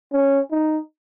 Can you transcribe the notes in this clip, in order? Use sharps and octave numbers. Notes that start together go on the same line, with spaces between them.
C#4
D#4